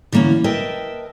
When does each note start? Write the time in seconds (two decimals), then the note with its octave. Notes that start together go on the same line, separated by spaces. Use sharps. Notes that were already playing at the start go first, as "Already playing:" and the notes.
0.12 D3 E3 A#3 B3 C#4
0.44 A#4 B4 D#5 E5 G5 A5